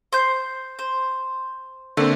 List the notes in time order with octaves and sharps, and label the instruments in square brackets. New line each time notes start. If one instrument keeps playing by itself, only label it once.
[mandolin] C5 G6
C5
[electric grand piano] D3 A#3 C4 [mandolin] A3